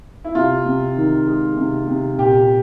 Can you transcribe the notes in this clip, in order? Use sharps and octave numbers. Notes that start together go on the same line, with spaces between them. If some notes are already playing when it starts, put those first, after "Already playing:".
E4
C3 F4
C3
D#3
G#3
C3
C3
A#2 G4